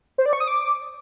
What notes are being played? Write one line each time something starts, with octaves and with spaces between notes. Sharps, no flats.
C5
D5
C#6
D#6
D6